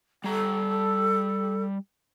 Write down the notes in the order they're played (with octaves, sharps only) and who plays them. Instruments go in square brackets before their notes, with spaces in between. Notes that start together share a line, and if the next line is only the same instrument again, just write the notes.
[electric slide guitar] G3 A#5 [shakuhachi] A4